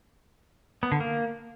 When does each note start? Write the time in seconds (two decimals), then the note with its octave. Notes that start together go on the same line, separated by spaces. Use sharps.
0.83 B3
0.92 D3
1.00 A#3